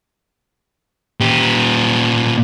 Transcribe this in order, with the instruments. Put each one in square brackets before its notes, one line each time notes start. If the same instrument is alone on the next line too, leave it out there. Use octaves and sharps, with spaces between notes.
[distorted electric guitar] A#2 G4